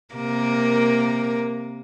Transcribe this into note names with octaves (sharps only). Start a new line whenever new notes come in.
C3 A#3 A#4